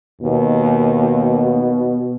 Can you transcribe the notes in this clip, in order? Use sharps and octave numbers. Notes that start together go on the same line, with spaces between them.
D#2 B2